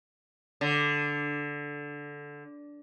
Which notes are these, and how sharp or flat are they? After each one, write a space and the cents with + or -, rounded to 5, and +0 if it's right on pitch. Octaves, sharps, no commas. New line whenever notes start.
D3 -10